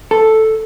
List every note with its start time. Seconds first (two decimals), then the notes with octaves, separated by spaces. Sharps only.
0.11 A4